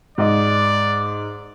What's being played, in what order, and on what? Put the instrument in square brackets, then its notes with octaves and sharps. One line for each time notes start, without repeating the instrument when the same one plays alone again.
[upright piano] G#2 D#5 [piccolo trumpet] D5